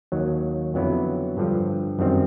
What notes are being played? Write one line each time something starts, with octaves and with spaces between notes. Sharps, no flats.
D#2 D#3 F#3
F2 D3 F#3 B3 E4
G2 D3 F3
F#2 D#3 G3 C4